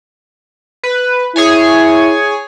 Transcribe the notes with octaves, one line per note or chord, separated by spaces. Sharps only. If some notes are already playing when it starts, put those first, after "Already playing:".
B4
E4 G#4 C#5 G#5